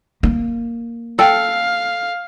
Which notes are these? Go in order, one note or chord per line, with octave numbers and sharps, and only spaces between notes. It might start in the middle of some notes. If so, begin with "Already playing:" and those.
A#3
A4 F5 G5